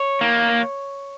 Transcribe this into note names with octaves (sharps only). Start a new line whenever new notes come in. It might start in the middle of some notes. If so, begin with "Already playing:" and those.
Already playing: C#5
A#3